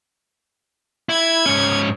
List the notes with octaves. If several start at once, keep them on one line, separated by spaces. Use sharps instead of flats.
E4 G#6
G#2 C#4